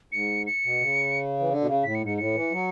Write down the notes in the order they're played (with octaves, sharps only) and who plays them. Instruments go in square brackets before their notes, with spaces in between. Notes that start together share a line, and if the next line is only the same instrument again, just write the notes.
[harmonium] G#2 [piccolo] C#7
[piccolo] C#7
[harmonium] B2
C#3
E3
D3
B2
C#3
[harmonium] A2 [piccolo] B6
[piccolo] C#7
[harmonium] G#2
[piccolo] C#7
[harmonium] A2 [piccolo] C#7
[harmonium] E3
F#3